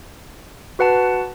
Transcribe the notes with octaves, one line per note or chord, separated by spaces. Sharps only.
F#4 B4 F#5 A5